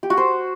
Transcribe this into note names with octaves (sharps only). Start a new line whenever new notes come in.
G4
F#4
C5